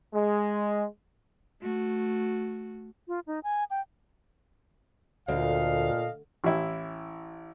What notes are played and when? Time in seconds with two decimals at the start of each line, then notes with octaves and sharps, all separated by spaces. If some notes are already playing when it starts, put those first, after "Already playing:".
0.14 G#3
1.61 A3 F#4
3.08 F4
3.27 D#4
3.44 G#5
3.70 G5
5.28 D2 A#2 A4 D#5 F5
6.44 A1 E4